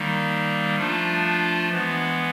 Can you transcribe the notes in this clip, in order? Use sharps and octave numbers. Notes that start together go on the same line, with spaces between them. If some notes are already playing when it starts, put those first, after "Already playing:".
Already playing: D#3 G3 A#3 D#4
F3 A3 D4 F4
E3 G#3 B3